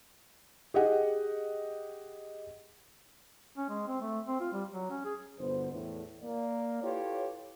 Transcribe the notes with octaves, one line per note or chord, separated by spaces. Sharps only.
G4 G#4 D#5 F#5
C#4
G#3
C4
A3
C4
F4
G3
F#3
C#4
G#4
G1 B2 D3 B3 C5
E2 A2
A#3 D5
E4 F4 G4 A4 B4 C#5